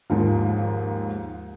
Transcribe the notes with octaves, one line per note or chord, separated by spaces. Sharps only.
D#2 G#2 F3